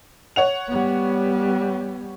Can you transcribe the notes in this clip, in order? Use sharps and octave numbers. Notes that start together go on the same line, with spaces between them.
C#5 F#5 F7
G3 B3